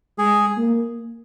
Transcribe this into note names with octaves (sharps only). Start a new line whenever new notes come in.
G#3 G#4
A#3